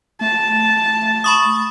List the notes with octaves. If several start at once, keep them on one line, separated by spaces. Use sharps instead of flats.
A3 A5
B5 C#6 D#6